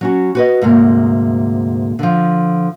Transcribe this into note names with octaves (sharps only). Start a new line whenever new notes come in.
F#3 C#4 F#4
F#4 B4 D#5
D2 G#2 C3 A#3
D3 F3